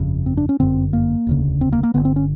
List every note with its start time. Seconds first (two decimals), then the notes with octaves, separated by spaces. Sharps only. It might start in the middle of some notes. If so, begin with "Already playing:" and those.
Already playing: G1 F2 C#3
0.26 C4
0.37 D4
0.49 C#4
0.60 G1 F#2 D3 C4
0.93 A#3
1.27 E1 D2 C#3
1.61 C4
1.72 A#3
1.83 A#3
1.94 G1 F2 D3 B3
2.05 C4
2.16 C#4